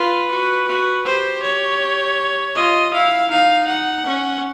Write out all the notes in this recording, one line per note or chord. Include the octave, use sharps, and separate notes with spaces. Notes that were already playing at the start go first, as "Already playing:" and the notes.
Already playing: F4 B4
F#4
F#4
G4 C5
C#5
F4 D#5
E4 F5
D#4 F5
F#5
C#4